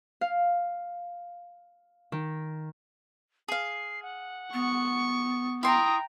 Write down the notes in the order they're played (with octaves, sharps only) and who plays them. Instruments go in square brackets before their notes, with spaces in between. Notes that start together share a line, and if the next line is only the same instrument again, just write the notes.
[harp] F5
D#3
[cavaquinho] G#4 F5 [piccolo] C7
[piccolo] F#5
[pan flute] B3 [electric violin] C#6
[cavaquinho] E4 C6 [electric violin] G5 A#5 [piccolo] D#6